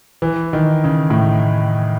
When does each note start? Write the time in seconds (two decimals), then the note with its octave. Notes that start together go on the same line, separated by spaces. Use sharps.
0.22 E3
0.53 D#3
0.84 C#3
1.10 A2